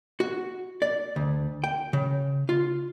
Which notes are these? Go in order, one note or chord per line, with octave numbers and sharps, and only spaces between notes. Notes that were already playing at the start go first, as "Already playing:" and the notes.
F#4
D5
D2
G5
C#3
F4